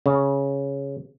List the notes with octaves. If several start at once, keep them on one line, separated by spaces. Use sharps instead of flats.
C#3